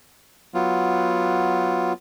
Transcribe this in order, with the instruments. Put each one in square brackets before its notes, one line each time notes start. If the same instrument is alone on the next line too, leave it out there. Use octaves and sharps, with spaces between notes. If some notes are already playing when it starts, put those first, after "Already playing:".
[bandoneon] F#3 B3 F4